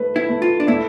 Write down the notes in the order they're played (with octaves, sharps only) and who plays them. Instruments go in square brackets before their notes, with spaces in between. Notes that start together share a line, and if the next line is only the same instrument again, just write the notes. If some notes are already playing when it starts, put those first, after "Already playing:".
Already playing: [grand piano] A3 B4
[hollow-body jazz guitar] E4
[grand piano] A3
[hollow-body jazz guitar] F4
D4
[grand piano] A3 [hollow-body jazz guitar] E4